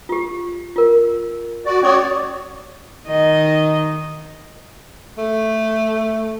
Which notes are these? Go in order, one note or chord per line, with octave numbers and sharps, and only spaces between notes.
F4 G4
F4 A#4
F#4 D5
C#4 F#4 C#5 D5 D6 D#6
D#3 D#4 D#5
A3